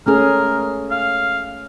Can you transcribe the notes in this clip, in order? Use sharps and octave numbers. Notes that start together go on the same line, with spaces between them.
A3 C#4 G#4 A#4
F5